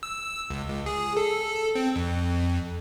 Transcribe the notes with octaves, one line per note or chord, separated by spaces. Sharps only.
E6
C#2
C#2
G#4
A4
C4
F2